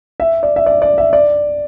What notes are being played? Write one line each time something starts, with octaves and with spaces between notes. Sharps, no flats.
E5
D5
E5
D5
D5
E5
D5